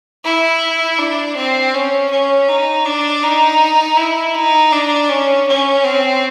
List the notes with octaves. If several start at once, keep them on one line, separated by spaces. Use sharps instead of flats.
E4
D4
C4
C#4
C#4
D#4
D4
D#4
E4
D#4
D4
C#4
C#4
C4